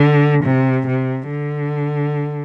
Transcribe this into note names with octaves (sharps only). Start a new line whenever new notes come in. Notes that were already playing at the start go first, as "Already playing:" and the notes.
Already playing: D3
C3
C3
D3